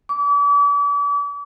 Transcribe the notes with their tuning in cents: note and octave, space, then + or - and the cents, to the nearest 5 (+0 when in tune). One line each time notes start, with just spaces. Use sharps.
D6 -40